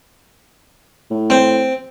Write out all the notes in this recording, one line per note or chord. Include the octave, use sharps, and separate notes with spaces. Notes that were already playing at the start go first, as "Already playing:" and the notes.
A2
C4